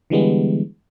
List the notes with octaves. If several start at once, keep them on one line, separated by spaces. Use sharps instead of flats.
D3 E3 G3 G#3 B3